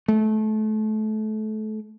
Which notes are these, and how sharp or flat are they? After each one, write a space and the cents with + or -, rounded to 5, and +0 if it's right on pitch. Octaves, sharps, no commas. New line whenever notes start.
A3 -25